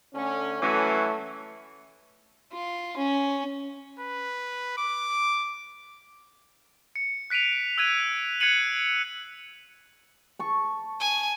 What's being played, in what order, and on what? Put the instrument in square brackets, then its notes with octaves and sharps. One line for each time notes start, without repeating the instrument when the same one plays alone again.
[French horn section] D3 A3 C#4
[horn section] E3 F#3 C#4 [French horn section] A3
[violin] F4
C#4
[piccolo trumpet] B4
D6
[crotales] C#7
F#6 B6 D7 D#7 F7
E6 F#6 G#6 D#7
F#6 G#6 C7 C#7 D#7 F#7
[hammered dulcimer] A5 C#6
[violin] G#5